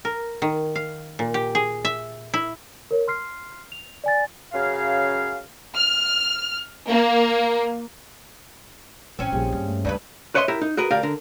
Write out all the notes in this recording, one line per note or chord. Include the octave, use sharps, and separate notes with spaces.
A#4
D#3
F5
A#2
G4
G#4
E5
E4
A#4 C#5
C6 F6 C7
F7
D5 G#5 A6
F#2 C#3 F5
F6
A#3
A1 C4 C#4
A#1 G3 A#3 G#4
G2
A3
D2 G2 C#3 B4
B4 C#5 D#5 E5 C6
E4 G4 A#4 E5
D#4
F#4 G#4 A#4 B4
D2 G4 A#4 D5 F5
D3 A#4